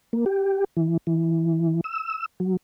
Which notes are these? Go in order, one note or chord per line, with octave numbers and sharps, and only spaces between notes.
A#3
G4
E3
E3
E6
F#3